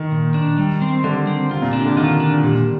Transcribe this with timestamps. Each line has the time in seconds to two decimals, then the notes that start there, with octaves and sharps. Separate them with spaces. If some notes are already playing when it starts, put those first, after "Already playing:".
Already playing: D#3
0.12 A#2
0.34 D4
0.58 G3
0.81 C4
1.04 D3 G3
1.27 C4
1.50 C3 F4
1.62 A#2
1.73 C3 D4
1.85 D3
1.97 D#3 F4
2.20 D4
2.43 A#2 G3